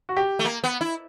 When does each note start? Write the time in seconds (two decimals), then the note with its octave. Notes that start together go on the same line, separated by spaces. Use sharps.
0.09 F#4
0.17 G4
0.39 A3
0.45 A#3
0.64 B3
0.81 E4